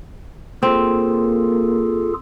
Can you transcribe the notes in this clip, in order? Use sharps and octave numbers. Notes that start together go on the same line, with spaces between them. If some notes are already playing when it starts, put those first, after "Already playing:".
A#3 C4 F4 G#4 A4